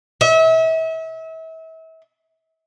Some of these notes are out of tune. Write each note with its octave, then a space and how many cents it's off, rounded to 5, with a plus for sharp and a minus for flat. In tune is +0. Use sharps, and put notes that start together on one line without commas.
E5 -35